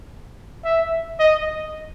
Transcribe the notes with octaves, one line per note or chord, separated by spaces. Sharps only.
E5
D#5